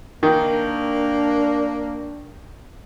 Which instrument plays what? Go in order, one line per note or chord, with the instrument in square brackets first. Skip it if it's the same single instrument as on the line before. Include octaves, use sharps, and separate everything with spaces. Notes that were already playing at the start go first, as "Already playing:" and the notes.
[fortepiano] D#3 [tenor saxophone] A#3 [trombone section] D4